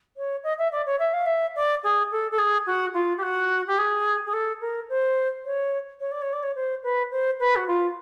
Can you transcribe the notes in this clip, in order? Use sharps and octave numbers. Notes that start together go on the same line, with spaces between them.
C#5
D#5
E5
D5
C#5
E5
F5
E5
D5
G#4
A4
A4
G#4
F#4
F4
G4
F#4
G4
G#4
G#4
A4
A#4
C5
C#5
C#5
D5
C#5
D5
C#5
C5
B4
C5
B4
F#4
F4